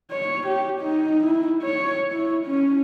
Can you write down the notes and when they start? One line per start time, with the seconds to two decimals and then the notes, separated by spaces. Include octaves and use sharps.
0.12 C#5
0.47 G4
0.81 D#4
1.24 E4
1.63 C#5
2.12 E4
2.47 C#4